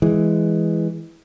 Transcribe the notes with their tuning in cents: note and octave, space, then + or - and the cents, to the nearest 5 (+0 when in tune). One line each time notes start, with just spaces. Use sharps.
E3 +0 G#3 +0